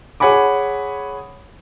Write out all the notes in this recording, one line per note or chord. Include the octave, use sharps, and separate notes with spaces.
G#4 C#5 F#5 G#5 B5 D6